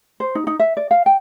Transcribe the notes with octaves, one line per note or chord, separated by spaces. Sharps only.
C5
D#4
D#4
E5
D5
F5
G5